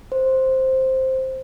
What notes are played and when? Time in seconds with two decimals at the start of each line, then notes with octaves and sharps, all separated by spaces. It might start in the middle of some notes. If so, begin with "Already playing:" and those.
0.12 C5